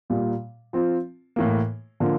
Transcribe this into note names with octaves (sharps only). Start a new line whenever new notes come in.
A#2 G3 A#3
F3 C4 F4
A2 E3 A#3
D3 F3 A#3 F4